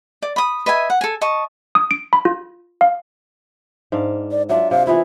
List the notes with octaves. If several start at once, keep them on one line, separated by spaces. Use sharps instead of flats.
D5
B5 D#6
B4 D#5 E5 G#5
F#5
A4 G#5
D#5 A5 C#6
D#6
D7
B5
F4
F5
G#2 D4 F5
D5
F#3 D4 F4 E5
C3 F5
E3 B3 E4 F4